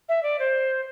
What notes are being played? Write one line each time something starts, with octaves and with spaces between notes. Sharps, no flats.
E5
D5
C5